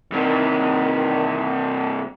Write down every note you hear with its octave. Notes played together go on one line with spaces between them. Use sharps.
G2 C3 D#3